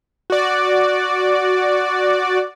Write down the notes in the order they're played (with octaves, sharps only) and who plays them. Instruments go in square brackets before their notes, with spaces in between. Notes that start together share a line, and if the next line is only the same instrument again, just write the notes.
[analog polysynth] F#4 D5